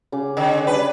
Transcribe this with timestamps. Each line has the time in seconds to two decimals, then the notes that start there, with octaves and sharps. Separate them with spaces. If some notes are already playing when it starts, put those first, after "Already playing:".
0.12 C#3 G#4 D6
0.37 D3
0.67 G3 D4 G#4 B4